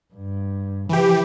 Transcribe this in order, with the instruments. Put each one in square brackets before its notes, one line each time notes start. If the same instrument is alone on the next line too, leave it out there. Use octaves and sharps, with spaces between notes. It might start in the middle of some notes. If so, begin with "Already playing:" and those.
[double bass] G2
[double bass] C#3 F3 [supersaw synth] E3 G4